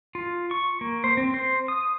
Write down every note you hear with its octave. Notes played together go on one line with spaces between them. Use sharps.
F4
C#6
A#3
C5
C4
C5
D#6